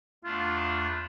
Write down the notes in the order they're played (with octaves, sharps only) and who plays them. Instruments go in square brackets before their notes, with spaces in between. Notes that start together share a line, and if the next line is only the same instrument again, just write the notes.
[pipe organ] E2 A3 D4 [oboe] F4